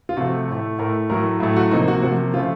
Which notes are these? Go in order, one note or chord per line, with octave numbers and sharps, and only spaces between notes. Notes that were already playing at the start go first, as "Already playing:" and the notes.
F4
C3 F3 A3 F#4
A2 A3
A2 A3 A#4
A2 F#3 A3 A#4
A2 F#3 A3
F#4
C3 F3 A#3 D#4
F#4
C3 F3 A#3 F#4
C#3 F3 A3 F4